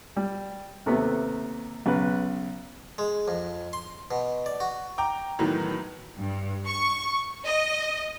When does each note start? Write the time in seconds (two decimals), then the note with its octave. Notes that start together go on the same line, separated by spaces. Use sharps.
0.17 G3
0.86 D#2 C3 A3 B3
1.86 B1 C#3 B4
2.98 G#3
3.28 F2
3.73 C6
4.11 B2
4.46 D5
4.60 F#4
4.98 G5 A#5 D6
5.39 A2 D#3 E3 F#3 B3
6.16 G2
6.65 C#6
7.45 D#5